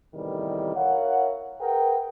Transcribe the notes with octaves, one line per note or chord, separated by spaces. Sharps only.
E2 A2 C3 D#3 E3 G3
E4 A#4 C#5 F5 F#5
G#4 A#4 B4 F#5 G5